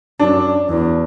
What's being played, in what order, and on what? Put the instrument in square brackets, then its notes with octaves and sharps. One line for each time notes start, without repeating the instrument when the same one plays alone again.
[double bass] F#2 [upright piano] D4
[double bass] E2